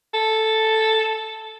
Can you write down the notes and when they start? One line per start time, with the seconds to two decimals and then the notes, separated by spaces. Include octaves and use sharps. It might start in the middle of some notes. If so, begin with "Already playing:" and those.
0.14 A4